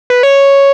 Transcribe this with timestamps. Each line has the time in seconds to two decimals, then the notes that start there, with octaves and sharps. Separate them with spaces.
0.10 B4
0.23 C#5